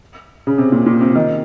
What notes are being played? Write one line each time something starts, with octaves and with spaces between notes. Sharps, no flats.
C#3
C3
A#2
A#2
C3
D#3